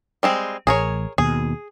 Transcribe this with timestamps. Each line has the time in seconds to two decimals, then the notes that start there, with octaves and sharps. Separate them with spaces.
0.23 G3 G#3 C4
0.67 A1 G#4 A#4 C#5
1.18 D#2 B2 G#4